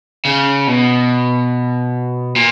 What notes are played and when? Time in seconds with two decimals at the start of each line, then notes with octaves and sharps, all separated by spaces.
0.25 C#3
0.67 B2
2.36 A#2